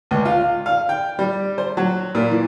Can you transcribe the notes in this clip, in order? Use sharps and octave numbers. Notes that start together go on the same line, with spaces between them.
C#2
F4
F5
G5
G3
C5
F#3
A#2
E3